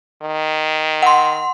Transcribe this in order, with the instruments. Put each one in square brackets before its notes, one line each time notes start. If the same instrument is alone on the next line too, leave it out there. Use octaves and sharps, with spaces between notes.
[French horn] D#3
[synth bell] F#5 C6